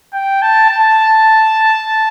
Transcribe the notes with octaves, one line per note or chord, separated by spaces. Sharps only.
G5
A5
A5